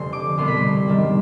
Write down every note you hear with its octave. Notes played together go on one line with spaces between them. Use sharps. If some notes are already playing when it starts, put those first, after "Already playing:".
Already playing: F1 D3 C6
D6
C2 B2 G3 B3 C6
B5
C6
G#2 D#3 G3 D4